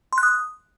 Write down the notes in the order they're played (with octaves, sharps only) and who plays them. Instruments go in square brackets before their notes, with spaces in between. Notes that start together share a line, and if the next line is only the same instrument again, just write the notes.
[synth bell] C6
F#6
D#6